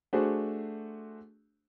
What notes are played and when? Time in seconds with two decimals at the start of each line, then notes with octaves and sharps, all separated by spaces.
0.13 A3 D4 F#4 G#4 C5